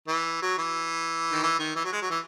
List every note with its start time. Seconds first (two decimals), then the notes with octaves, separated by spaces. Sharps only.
0.08 E3
0.42 F#3
0.58 E3
1.32 D#3
1.43 E3
1.60 D#3
1.76 E3
1.84 F#3
1.93 G#3
2.02 F#3
2.10 E3